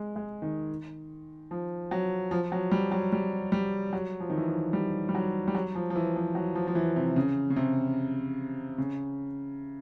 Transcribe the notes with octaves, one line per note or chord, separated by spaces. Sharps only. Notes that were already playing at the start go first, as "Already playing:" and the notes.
Already playing: G#3
G#3
D#3
F3
F#3
F3
F#3
G3
F#3
G3
G3
F#3
F3
D#3
E3
F3
G3
G3
F#3
G3
F#3
F3
F3
E3
F3
F#3
F3
F3
E3
C3
C#3
C#3
C3
C#3